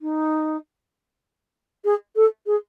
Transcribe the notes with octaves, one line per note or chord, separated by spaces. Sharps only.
D#4
G#4
A4
G#4